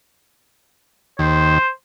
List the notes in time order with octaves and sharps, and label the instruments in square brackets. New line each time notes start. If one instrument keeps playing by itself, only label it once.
[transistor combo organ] D#2 [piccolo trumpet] C5